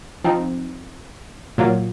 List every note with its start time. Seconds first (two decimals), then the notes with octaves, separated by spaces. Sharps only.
0.24 F3 C4 D#4
1.58 A#2 F#3 A#3 F4